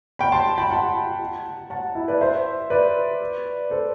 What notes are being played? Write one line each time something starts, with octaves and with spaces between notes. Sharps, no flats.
G5 B5
A5 C6
G5 B5
F#5 A5
F#5 A5
E4
B4 D5
C5 E5
B4 D5
A4 C5